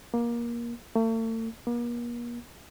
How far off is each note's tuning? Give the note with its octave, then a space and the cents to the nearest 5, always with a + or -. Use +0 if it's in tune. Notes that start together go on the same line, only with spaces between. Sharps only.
A#3 +20
A3 +40
A#3 +40